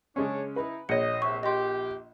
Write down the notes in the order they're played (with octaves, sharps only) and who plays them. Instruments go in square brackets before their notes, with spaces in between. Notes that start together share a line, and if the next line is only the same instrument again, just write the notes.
[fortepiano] C#3 G#3 C#4 [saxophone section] D4 C#5
[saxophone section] D#4 E4 [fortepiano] B4
[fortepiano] A#1 [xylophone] C#5 C#7 [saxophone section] D#5
[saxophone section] E2 C3 E5 [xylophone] C#6
[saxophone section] G4 [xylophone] D#5 C6